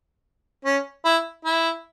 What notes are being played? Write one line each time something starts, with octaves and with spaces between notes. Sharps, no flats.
C#4
E4
E4